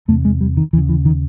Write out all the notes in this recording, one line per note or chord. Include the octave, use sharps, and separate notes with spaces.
E2 C3 A3
G#3
G3
D#3
D#2 C#3 E3
E3
D#3